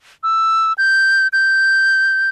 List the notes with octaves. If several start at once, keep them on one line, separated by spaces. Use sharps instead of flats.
E6
G6
G6